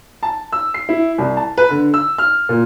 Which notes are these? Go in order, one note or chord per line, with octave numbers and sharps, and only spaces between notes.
A5
E6
C7
E4
C2
A5
B4
D3
E6
F6
A#2